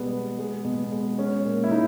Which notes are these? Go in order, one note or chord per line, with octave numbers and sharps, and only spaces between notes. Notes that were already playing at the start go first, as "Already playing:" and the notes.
Already playing: B2 G3 G#3 B3
G#3
G#3
B2
G#3
G#3 C#4
A#2
E4
G#3 D#4